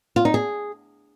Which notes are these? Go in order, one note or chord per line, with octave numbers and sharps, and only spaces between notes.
F4
D#4
G#4